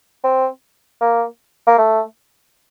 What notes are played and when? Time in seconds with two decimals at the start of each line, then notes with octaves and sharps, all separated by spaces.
0.24 C4
1.01 A#3
1.67 A#3
1.78 A3